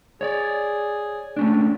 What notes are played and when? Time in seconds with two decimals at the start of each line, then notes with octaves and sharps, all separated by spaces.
0.21 G#4 C#5 D5
1.37 A3 C#4 D4